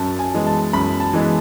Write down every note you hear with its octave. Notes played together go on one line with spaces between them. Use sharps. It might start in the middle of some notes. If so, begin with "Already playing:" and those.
Already playing: F#2 A5
G#5
E3 G#3 B3
A5
F#2 B5
A5
E3 G#3 B3